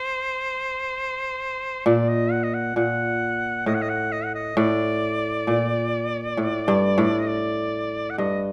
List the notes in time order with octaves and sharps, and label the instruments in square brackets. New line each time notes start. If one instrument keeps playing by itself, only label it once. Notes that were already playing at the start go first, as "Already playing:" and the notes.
Already playing: [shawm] C5
[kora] A#2 [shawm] D5
[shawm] D#5
F#5
D#5
F#5
[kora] A#2 [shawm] F#5
[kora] A2 [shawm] D#5
[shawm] F#5
D#5
F#5
D#5
F#5
D#5
[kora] A2 [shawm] D5
[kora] A#2
A2
G2
A2
[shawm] D#5
D5
F#5
[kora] G2 [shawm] D#5